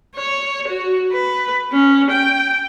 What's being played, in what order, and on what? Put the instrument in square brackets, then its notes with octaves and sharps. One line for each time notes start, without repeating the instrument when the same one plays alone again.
[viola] C#5
F#4
B4
C#4
G5